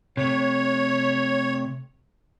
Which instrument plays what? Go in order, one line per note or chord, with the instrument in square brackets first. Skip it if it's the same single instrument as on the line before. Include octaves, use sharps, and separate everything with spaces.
[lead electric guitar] C3 A3 [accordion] C#5